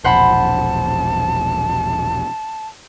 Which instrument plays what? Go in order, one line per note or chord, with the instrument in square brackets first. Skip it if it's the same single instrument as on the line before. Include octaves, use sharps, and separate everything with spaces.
[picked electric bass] E1 A#1 [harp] C5 F#5 B5 [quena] A5